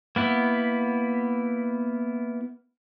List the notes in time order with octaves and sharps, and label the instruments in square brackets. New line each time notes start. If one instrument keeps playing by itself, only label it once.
[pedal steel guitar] A#3 B3 E4